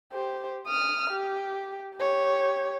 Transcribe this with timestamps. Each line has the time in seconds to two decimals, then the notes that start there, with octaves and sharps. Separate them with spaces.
0.13 G4 C5
0.66 D#6 F6
1.10 G4
1.96 G4 C#5